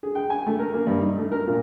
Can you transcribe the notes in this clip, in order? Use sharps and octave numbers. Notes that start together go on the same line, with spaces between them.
G#4
G5
G#5
A3
A#4
A#3
G2
D#4
A3
A#4
A#2